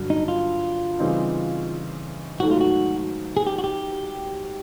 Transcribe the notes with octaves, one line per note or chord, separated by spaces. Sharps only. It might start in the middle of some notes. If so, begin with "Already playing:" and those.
Already playing: G2 D3 F#3
D#4
F4
C#3 E3 G3 C4 D#4
G#2 D#3 F#3 A3 F#4
F4
F#4
G#4
G4
F#4
G4